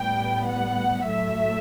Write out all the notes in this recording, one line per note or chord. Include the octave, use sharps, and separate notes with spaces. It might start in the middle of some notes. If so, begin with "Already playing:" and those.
Already playing: A2 G3 B3 G5
F#5
A2 F#3 A3 E5